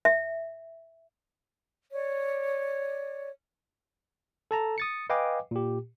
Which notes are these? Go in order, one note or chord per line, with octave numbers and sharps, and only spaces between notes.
E5
C#5 D5
A4 A5 A#5
D#6 A6 C#7
B4 D#5 F5 G5 G#5 D6
A#2 G4